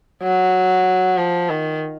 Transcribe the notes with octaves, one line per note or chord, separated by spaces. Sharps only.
F#3
F3
D#3